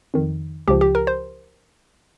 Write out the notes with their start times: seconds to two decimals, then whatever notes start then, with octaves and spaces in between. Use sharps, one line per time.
0.14 F2 D#3
0.68 C#2 C#3 F3 G4
0.81 G4
0.95 A#4
1.07 C5